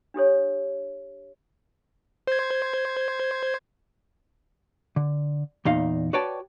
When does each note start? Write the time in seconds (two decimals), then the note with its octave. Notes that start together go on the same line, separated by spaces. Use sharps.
0.14 D4 G4 A4 C#5
2.27 C5 G#6
4.96 D3
5.65 E2 A#2 D#4 F5
6.13 F#4 B4 C#5 D5 G5 A5